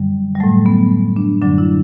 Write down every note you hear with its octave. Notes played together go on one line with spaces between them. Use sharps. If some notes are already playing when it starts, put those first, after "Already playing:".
Already playing: F#2 D3 F#3 G3
G3
A2 F#3 A3
B3
D4
F#2 D3 F#3 D4
E4